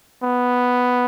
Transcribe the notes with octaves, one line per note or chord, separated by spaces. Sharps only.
B3